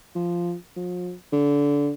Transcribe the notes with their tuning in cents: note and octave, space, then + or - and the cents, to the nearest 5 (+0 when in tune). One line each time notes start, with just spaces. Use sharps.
F3 -5
F3 +40
D3 -25